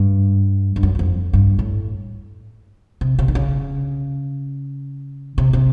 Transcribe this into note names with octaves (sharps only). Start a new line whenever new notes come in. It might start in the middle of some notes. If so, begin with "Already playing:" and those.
Already playing: G2
G2
F#2
F#2
F2
G2
A2
C3
C3
D3
C#3
C3
C3